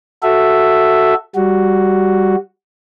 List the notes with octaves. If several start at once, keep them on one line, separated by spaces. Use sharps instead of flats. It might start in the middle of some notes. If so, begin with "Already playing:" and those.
F#4 A4 E5
G3 F#4